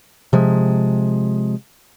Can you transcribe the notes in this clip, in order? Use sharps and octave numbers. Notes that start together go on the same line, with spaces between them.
C3 F3 G#3